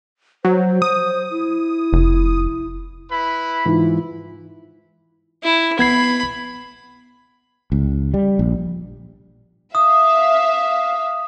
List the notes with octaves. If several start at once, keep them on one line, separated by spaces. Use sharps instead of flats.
F#3 C5
D#6
E4
F1
E4 B4 B5
G#2 E3 F4
E4
B3 B5 G#6 C7
C#2
G3
A#1
E5 F5 D#6